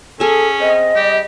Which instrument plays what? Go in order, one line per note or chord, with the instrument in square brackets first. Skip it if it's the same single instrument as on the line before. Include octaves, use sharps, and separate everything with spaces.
[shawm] C#4 [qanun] G#4 E5 [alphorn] A4
[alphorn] C4 [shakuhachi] D#5
[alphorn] G3 [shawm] G4